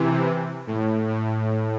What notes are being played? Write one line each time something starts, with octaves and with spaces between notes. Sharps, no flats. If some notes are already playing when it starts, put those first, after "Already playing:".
Already playing: C3 E3
A2
A2